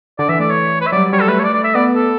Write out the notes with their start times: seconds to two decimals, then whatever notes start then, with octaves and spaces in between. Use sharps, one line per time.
0.19 D3 D5
0.29 E3 E5
0.39 A3 D5
0.50 C#5
0.81 B4
0.87 E5
0.92 F#3 D5
0.96 G3
1.13 G3 C#5
1.21 A4
1.28 A3 B4
1.39 C#5
1.44 D5
1.54 D5
1.64 E5
1.75 B3 D5
1.96 A4